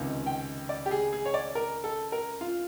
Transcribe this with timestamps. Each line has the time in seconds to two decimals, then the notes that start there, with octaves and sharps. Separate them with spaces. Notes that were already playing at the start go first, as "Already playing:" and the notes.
Already playing: C#2 C3 D#3
0.26 G5
0.69 D5
0.86 G4
0.91 G#4
1.13 G#4
1.25 C#5
1.34 D5
1.55 A#4
1.84 A4
2.12 A#4
2.41 F4